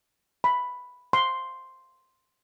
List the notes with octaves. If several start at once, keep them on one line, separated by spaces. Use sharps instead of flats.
B5
C6